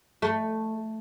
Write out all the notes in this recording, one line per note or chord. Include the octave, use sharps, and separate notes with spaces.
A3